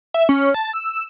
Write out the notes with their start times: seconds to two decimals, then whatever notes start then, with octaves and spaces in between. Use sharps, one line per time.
0.14 E5
0.29 C#4
0.54 A5
0.73 E6